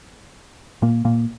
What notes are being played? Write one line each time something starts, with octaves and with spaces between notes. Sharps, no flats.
A#2 A#3
A#2 A#3